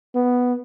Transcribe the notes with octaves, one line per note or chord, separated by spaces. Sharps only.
B3